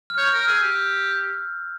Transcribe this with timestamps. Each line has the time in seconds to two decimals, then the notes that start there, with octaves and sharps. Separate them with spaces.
0.10 F6
0.18 C#5 G6
0.32 A#4 F6
0.47 G#4 E6
0.63 G4